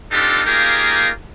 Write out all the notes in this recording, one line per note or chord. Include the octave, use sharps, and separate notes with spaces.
C4 D4 D#4 F4 G4 A4
A#3 D#4 F4 G4 G#4 A#4